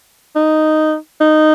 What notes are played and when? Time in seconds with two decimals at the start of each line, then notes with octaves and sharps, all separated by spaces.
0.36 D#4
1.21 D#4